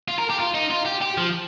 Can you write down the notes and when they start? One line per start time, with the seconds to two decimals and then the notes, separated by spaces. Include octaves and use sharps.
0.08 F4
0.18 A#4
0.30 G4
0.39 F4
0.54 D#4
0.71 F4
0.86 G4
1.02 G4
1.17 F3